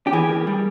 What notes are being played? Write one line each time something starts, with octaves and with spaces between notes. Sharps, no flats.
G4
E3 G#4
A#3
G3